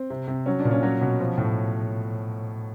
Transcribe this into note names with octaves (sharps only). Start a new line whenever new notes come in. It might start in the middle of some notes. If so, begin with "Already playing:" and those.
Already playing: C4
C3
C3
F#3 C#4
D4
A#2
C#4
F#3 C#4
B2
F3
A2